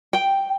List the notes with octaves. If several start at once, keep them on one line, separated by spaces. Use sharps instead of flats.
G5